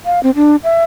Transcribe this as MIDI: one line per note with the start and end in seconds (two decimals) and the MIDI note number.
0.05 0.22 77
0.23 0.31 60
0.35 0.56 62
0.64 0.84 76